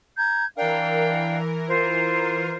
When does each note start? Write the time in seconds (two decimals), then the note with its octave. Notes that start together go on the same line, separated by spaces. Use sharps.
0.17 A#5 G6 G#6
0.57 E3 D4 A#4 F5 G5
1.68 F4 C5